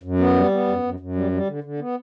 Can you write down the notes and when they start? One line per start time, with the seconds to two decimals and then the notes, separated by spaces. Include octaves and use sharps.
0.03 F#2
0.19 B3
0.35 G3
0.51 B3
0.67 F#2
0.83 F#2
1.00 F#2
1.15 G3
1.32 G3
1.47 D3
1.64 D3
1.79 B3